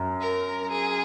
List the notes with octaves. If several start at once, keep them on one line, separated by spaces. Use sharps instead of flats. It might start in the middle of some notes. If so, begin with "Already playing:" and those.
Already playing: F#2
A#4
G#4